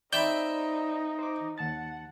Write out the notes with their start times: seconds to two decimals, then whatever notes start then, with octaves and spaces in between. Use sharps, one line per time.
0.13 C4 D#4 D5 E5 B5 G6
1.19 C5 D6
1.58 D#2 F#5 A5 A6